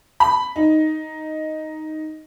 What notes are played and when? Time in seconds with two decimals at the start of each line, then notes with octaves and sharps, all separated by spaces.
0.20 B5
0.56 D#4